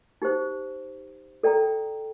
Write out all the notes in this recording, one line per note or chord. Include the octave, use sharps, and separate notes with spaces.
D#4 G4 C5
A4 D5 G5 A#5